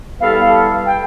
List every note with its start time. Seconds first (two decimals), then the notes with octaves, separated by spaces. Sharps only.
0.20 G3 B3 E4 A4 F5
0.86 G5